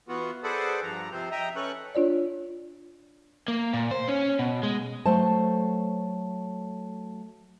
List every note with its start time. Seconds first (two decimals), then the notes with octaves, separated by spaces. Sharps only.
0.08 E3 B3 F4 F#4
0.43 G#4 A4 B4 C5 D5 F#5
0.83 G2 F3 A#5
1.12 C3 F3 C4 C5
1.32 D#5 E5 G5 A#5
1.56 C#4 A4 B4 C#6 F#6
1.95 D4 F4 C#5 D5
3.48 A#3
3.73 A#2
3.91 C5
4.08 C#4
4.39 B2
4.63 G#3
5.06 F#3 A3 C5 A5